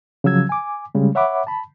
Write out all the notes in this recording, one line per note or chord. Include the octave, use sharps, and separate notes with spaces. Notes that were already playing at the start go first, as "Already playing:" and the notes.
C#3 F3 F#3 E6 G#6
G#5 D6
C#3 G3 G#3
C#5 E5 F#5 B5 D6
A5 B5